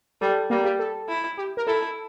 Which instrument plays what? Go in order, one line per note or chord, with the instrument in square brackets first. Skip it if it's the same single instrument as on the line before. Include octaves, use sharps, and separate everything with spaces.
[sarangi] G3 [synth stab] A4
[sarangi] G3 [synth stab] A#3
[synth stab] G4
A4
[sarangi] E4
[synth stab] G4
A#4
[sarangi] E4 [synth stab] A4